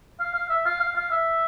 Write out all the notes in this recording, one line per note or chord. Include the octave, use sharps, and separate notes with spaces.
F5
F5
E5
F5
F5
F5
E5